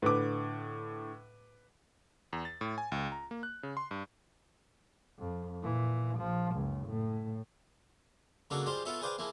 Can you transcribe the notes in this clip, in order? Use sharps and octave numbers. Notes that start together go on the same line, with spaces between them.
A2 D3 B4 D6
E2
A6
A2
G#5
C#2
A#5
A#3
F#6
C#3
C6
G2
F2
A#2 E3
A#1 F3
F#1 C#2
A2
C#3 F#3 G#3 A#3 D4 A4
G3 G#3 F4 G4 C5 D5
B3 F4 A4 C#5 E5 A5
G#4 B4 C5 D5 F5 G5
F3 G#3 A#3 E4